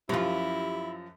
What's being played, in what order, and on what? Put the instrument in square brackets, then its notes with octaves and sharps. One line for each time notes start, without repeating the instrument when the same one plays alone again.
[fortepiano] F#2 F3 [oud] C#4 F4 [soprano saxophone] E4 [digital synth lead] G4